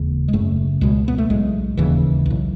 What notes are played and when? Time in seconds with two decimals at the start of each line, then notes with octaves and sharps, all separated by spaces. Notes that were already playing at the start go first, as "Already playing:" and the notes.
Already playing: E1 D#2 C#3
0.28 G#3
0.33 F#1 F#2 C#3 A3
0.81 C#2 B2 G#3
1.08 B3
1.18 A3
1.30 B1 A2 G#3
1.77 E1 D#2 C#3 E3
2.26 B1 A2